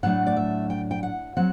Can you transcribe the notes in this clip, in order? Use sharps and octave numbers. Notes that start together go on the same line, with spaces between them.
A2 F#3 A3 D4 F#5
D5
E5
G5
G5
F#5
F#3 C4 F#5